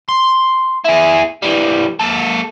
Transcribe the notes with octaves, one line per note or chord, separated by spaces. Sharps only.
C6
E4 G#4
E3 G3
A#3 A4